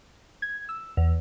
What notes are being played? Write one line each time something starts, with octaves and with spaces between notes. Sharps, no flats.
G#6
E6
E2